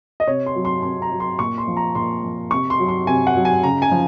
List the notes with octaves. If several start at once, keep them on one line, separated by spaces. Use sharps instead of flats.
D#5
C3 C#5
C6
F#3
C6
C3 C6
A#5
F#3
C6
A#2 C#6
C6
F3
A#5
A#2 C6
F3
C3 C#6
C6
F#3
C6
C3 G#5
F#5
F#3
G#5
C#3 A#5
G#5
F3